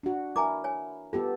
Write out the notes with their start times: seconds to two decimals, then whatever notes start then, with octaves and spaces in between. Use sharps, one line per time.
0.03 D4 F#4
0.36 E4 A#4 G#5 A#5 D6
0.64 C#5 G#5
1.13 B3 F4 G4 A4